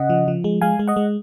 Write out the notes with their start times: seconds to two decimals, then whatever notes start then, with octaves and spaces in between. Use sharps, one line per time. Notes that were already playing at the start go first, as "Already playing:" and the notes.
Already playing: C#3 D#5 F#5
0.10 F3
0.28 F3
0.44 G#3
0.61 G#3 F5 G#5
0.79 G#3
0.88 D#5 F#5
0.96 G#3